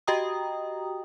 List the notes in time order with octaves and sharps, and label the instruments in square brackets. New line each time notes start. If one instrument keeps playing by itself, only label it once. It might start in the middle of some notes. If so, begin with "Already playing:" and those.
[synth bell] F#4 G4 D#5 G5 A#5 D#6